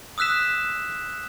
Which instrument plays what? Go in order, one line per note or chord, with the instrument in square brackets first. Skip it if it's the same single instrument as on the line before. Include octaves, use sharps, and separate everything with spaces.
[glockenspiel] D#6 E6 F#6 B6 E7